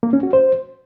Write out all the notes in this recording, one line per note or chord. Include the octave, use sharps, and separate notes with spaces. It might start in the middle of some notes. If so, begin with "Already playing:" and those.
A#3
C#4
F#4
C5